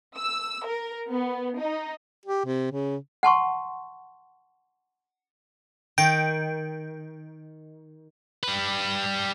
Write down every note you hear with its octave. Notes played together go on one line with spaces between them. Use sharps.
E6
A#4
B3
D#4
G4
C3
C#3
F#5 A5 C6 C#6
D#3 G5
G3 B4